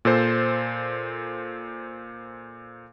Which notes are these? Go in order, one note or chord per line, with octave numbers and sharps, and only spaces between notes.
A#2 A4 C5